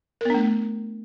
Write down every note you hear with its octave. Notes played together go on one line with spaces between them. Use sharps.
A3 B3 D4 A#4